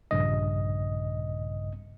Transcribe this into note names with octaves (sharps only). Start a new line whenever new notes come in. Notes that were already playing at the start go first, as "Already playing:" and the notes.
A#1 G2 C#3 D#5